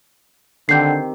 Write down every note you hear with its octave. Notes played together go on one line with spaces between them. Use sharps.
D3 D#3 C4 G4 G6 C7